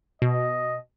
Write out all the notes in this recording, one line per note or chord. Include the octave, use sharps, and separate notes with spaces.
B2 D#5